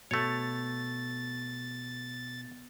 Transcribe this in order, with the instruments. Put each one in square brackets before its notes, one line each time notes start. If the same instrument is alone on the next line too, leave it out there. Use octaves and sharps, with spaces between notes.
[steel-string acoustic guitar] B2 [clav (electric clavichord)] A3 C#5 [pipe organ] A6